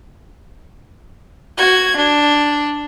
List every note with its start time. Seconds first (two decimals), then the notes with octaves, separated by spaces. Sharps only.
1.57 F#4 G#6
1.96 D4